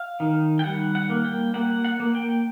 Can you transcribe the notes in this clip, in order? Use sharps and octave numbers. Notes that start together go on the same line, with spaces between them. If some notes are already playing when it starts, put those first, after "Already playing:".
Already playing: F5
D#3
G5
G3 F#5
F#5
A#3
G5
A#3 F#5
F#5
A#3
G5